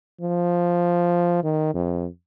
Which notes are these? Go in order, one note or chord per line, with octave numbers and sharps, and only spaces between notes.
F3
D#3
F2